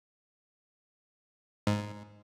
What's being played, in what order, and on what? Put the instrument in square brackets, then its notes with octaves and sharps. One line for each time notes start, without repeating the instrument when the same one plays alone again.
[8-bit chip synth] G#2